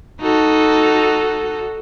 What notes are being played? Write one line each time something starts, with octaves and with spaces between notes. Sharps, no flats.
D#4 F#4 A4